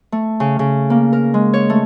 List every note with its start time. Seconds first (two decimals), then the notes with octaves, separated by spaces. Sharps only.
0.12 A3
0.40 C#3
0.59 C#3
0.90 A#3
1.13 A#4
1.34 G#3
1.53 C#5
1.70 A3